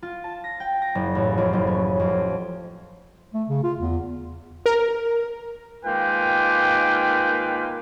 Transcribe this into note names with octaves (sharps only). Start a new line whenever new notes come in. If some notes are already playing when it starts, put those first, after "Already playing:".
F4
A5
A#6
G5
A#6
F#1
A1
F2
F#1
C#4
F2
A3
C#3
F4
E2
A#4
G#2 D#3 A#3 F4 B4 G5